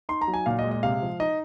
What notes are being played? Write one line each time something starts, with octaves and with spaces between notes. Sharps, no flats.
D#4 C6
A#5
F#3
G#5
A#2 F5
D#5
G#3
D#5
C3 F5
F3
D#4 D#5